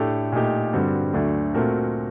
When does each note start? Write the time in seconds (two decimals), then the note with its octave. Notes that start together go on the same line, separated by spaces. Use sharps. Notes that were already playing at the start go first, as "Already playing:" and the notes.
Already playing: A2 A3 D4 G4
0.32 A#2 A3 D#4 G4
0.73 G2 D3 G3 C4 F#4
1.13 D2 D3 F#3 A3 D4
1.54 A#2 A3 C4 F#4 A#4